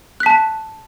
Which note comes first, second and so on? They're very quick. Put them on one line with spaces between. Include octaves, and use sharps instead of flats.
F#6 B6 A5